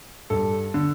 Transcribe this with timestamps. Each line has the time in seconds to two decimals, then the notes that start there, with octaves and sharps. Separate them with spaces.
0.30 G2 A4
0.74 D3